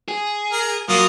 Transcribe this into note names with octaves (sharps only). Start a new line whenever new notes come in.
G#4
A#4
F#3 A#3 F4 D#6